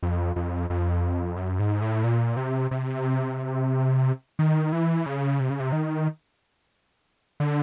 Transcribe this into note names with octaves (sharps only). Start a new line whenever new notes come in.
F2
F2
F2
F#2
G#2
A2
A#2
C3
C3
D#3
E3
C#3
C3
C#3
C3
D#3
D3